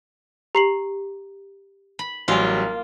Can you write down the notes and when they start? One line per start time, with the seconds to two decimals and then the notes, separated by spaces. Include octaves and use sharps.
0.55 G4 A#5 C7 F#7
1.99 B5
2.28 A1 F#3 G3 A#3 F4 D#5 G#5